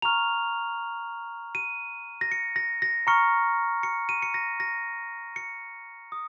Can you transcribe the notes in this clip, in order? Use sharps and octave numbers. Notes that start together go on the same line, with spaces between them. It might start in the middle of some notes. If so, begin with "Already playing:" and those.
A#5 C#6 F6 F7
D#7
A#6
C#7
A#6
A#6
A#5 C#6 F6 C#7
C#7
D#7
C#7
A#6
A#6
C#7
D#6